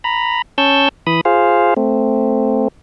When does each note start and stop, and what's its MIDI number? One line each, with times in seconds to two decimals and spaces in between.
0.04 0.42 82
0.04 0.42 83
0.58 0.89 61
0.58 0.89 81
0.58 0.89 85
0.58 0.89 88
0.58 0.89 91
1.07 1.21 52
1.07 1.21 83
1.07 1.21 87
1.25 1.74 65
1.25 1.74 68
1.25 1.74 72
1.25 1.74 77
1.77 2.68 57
1.77 2.68 60